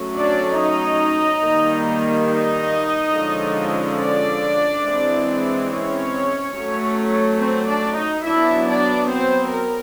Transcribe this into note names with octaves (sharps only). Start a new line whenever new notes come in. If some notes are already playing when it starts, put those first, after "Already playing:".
Already playing: F#3 A3 C#4
D4 D5
D#4 D#5
D#3 G3 A#3
D#4 D#5
D3 F3 G#3 C#4
D4 D5
E3 G#3 C4
C#4 C#5
F#3 A3 C#4
C4 C5
D4 D5
D#4 D#5
F#3 B3 D4 E4 E5
D4 D5
C4 C5
A#4